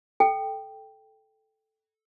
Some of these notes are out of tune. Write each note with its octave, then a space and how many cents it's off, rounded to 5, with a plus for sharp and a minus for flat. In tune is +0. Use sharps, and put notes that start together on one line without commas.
A4 -10 G5 +0